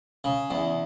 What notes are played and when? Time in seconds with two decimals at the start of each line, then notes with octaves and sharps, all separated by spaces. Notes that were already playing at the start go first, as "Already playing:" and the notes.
0.24 C#3
0.50 E2